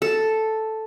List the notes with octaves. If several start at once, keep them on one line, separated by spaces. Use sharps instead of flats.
A4